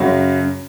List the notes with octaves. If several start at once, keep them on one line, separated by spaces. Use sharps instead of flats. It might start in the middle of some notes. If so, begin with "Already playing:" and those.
Already playing: F#2 C#3 F#3